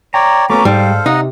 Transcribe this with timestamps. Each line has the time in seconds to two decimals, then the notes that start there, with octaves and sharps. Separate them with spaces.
0.14 C#5 D5 G5 A#5
0.50 A3 B3 C#4 F#4 A#5 D6
0.65 G#2 G3 A4 C5 F5
1.06 C3 D#4 D#5 F#5